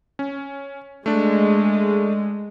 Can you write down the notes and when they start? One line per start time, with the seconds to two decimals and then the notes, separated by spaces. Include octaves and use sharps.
0.19 C#4
1.06 G#3 A3 D4